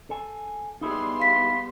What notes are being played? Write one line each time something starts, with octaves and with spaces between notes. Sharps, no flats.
A4 G#5
G3 B3 D#4 E4 G#4 C6
F5 B6